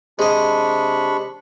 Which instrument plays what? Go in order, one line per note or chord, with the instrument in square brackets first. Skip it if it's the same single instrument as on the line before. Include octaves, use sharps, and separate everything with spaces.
[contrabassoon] C3 [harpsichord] G#3 D#5 [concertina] D4 B5 C#6